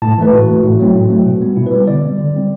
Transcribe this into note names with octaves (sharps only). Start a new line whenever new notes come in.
A2 A5
E3 A3 B4
A2 F#4
E3 A3
A2
F#3 A3 C4
A2
F#3 A3 C4
B2
G3 B3
B2 E4
B4
G3 B3
D3 D5
G3 C4
D3
G3 C4